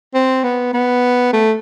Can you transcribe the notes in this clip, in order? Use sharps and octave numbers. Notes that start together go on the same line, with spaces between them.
C4
B3
B3
A3